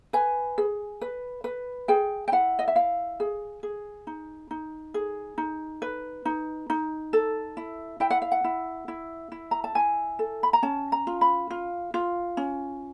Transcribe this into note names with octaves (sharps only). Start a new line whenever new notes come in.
B4 G#5
G#4
B4
B4
G#4 G5
G5
E4 F#5
D#5
E5
E4 F5
G#4
G#4
D#4
D#4
G#4
D#4
B4
D#4
D#4
A4
E4
E4 G5
F#5
F5
F#5
E4
E4
E4
A#5
A5
E4 G#5
A4
B5
A#5
C#4 A5
A#5
F4
B5
F4
F4
C#4